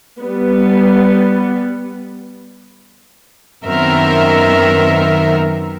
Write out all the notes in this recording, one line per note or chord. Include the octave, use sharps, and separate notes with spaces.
G3 B3
F#2 D#3 B3 C4 A#4 E5